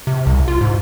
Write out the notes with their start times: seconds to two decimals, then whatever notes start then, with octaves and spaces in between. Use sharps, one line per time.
0.07 C3
0.27 C2
0.48 F4
0.61 G#2